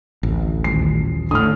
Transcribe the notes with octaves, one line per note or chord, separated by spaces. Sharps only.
A1 D2
D#1 C7
A2 D3 D#6 F6